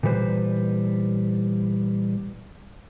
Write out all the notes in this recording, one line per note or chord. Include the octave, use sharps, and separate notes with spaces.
A#2 E3 G3 B4 C5